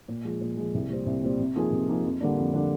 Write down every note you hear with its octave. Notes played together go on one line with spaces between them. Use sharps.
A#2
F3 G#3
A#2
F3 G#3
C2
A#2 G3 C4
C2
A#2 G3 C4
C3
F3 A#3 D#4 G#4
C3
F3 A#3 D#4 G#4
F2
D3 G3 A#3 D4
F2
D3 G3 A#3 D4